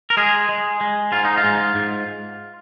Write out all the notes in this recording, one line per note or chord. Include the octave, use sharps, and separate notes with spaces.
A#4
G#3 G#4
G#3
G#3
G#2 F4
D#4
F4
G#2
G#2